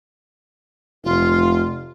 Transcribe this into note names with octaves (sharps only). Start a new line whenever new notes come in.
F1 F4